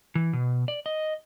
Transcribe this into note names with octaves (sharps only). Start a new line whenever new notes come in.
E3
B2
D5
D#5